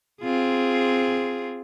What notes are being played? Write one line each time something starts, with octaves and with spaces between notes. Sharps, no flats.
C4 F4 G#4